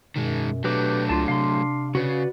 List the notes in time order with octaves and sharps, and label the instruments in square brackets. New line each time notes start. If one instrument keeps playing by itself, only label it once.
[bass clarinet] F#2 [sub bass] B2 [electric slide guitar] D#3 G#3
[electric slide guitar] F#3 A3 [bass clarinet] D4 [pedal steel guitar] G4 B4 D6
[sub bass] C#2 [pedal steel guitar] F4 A5
[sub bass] C3 [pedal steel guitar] F5 C6
[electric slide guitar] C#3 [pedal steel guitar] F#4 B4 D5